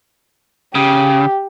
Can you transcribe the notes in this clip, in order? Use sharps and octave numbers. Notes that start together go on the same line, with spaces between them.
C#3 G4